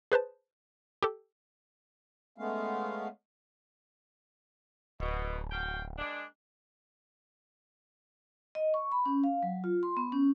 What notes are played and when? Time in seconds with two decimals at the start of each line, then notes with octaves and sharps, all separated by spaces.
0.12 G#4 B4 C5 A5
1.03 G4 A4
2.38 G#3 A3 B3 C#4 F5
5.00 D1 B2
5.52 F#4 F5 G5
5.98 G#3 A#3 D4
8.55 D#5
8.74 C#6
8.92 B5
9.06 C#4
9.24 F5
9.43 F#3
9.64 F4
9.83 C6
9.97 B3
10.12 C#4